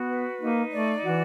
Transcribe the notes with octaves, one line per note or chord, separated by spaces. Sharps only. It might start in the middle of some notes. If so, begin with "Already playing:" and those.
Already playing: B3 F#4
B4
A#3 D#4
A3 D5
E3 F#4